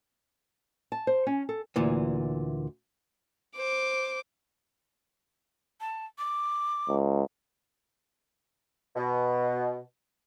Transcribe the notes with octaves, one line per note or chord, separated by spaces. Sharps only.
A5
C5
C#4
A4
D2 A#2 E3
C5 D6
A5
D6
C#2
B2